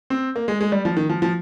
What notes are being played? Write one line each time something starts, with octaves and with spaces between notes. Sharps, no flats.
C4
A#3
G#3
G#3
G3
F3
D#3
F3
F3